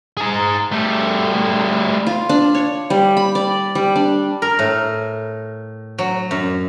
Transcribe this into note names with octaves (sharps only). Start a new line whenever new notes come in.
G#4 A#5
G3 A3
F4
D4
C#5
G3
B5
D5
G3
D4
A#4
A2
F#3
F#2